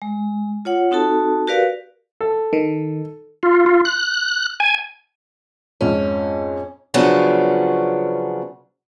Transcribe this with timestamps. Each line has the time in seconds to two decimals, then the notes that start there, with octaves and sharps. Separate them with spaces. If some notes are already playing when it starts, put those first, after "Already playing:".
0.02 G#3
0.65 F4 C#5 F#5
0.91 C4 D#4 F#4 A4 A5
1.47 F#4 G4 A#4 B4 D5 F5
2.21 A4
2.53 D#3
3.43 F4
3.66 F4
3.85 F#6
4.60 G#5
5.81 F2 G#2 C#4
6.94 C#3 F3 F#3 B3 C#4 D4